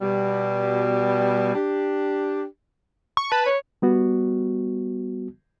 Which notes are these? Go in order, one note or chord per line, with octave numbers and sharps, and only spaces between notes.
B2 G3
D4 G4
C#6
B4 A5
C#5
G3 B3 F#4